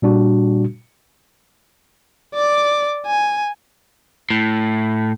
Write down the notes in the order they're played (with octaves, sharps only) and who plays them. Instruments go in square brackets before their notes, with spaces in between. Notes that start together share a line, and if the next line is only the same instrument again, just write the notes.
[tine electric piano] A#2 G3 D4 F#4
[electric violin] D5 D6
G#5
[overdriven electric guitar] A2